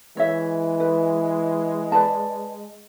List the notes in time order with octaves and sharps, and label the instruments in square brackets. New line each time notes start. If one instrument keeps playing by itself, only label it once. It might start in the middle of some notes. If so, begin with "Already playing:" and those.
[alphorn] E3 [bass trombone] G#3 [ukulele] C#5 E5
[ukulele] B4
B4 D5 A5